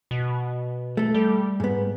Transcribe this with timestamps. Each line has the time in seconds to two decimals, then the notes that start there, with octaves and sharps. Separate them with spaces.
0.11 B2
0.97 A3 A4
1.14 G3
1.60 G#2 B3